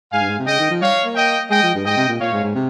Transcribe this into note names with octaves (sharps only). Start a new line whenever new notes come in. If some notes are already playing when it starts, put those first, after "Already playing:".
G#2 F5 G#5
G2
G#2
C3
C#3 D#5 G5
D#3
F3
G3 C#5 F5
A#3
D#5 G5
G#3 D#5 G5
F3
G2
G#2 D#5 G5
C3
A#2
A#2 C#5 F5
G#2
G#2
C3